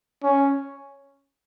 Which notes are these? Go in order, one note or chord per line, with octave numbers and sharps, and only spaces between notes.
C#4